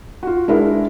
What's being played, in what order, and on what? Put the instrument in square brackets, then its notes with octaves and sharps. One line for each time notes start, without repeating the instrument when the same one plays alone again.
[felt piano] F4 F#4
G#3 D4 E4 A#4